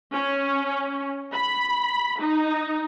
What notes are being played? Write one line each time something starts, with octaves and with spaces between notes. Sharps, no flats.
C#4
B5
D#4